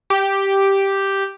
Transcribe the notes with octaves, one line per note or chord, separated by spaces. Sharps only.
G4